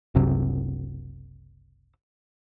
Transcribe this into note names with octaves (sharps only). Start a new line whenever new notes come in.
F#1 C2 F#2 C3